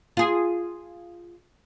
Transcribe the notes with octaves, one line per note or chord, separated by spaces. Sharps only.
F4 G#4